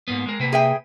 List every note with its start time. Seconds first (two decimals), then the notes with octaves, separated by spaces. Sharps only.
0.08 G#2 A#3 B3
0.26 G#3 A#4
0.40 C3 A#3 B4
0.53 G#4 E5 G5